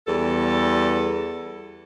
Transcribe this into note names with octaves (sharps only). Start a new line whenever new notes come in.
E2 G3 A4